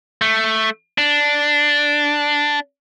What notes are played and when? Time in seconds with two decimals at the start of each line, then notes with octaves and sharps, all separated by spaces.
0.22 A3
0.98 D4